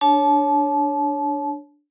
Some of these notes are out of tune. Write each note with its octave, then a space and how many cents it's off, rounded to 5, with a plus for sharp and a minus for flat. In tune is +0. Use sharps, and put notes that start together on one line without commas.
D4 -5 C#5 +0 A5 -35